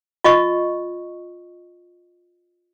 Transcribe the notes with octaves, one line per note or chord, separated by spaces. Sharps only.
F4 D#5 C#6